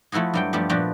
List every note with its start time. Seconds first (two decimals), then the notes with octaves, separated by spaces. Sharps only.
0.12 F3 A3 E4 F#4 G#4
0.34 G2 F#3 G5
0.53 G2 F3 A3 B3 G4
0.69 A#2 F3 B3 D4 F#4 G4